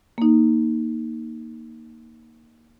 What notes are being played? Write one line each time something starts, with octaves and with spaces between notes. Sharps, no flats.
A#3 D#4